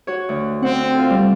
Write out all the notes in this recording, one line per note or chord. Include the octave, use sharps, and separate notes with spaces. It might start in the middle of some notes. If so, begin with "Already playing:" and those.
F#4 C#5
D2
C4 F#5
F4 A4
G3